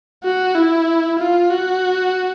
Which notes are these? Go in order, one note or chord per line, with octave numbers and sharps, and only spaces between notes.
F#4
E4
F4
F#4